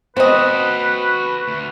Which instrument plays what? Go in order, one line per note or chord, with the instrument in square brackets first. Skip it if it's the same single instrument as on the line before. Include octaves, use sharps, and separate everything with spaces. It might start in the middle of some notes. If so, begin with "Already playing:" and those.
[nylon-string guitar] C4 [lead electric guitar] F#4 A4 [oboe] B4 [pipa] C5 D#5
[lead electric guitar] D2